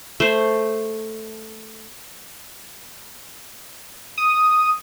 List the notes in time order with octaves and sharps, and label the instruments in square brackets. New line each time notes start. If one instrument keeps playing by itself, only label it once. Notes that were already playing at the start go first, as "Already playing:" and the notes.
[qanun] A3 C5
[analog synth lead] D#6